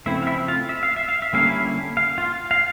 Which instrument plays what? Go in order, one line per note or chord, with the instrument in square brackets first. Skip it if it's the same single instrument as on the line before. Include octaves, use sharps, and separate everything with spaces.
[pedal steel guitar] C#3 F3 A3 C4 E4 E5
F5
E4 E5
F4 F5
E5
F5
E5
F5
E5
D3 G3 A#3 C#4 F5
E4 E5
F5
F4 F5
F5